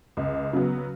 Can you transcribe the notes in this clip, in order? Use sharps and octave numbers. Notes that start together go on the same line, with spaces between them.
C#2
C#3 F#3 B3